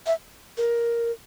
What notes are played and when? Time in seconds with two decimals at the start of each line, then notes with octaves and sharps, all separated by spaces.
0.06 E5
0.57 A#4